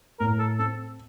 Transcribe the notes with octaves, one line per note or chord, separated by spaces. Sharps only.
A2 A#4
A4
C4 A4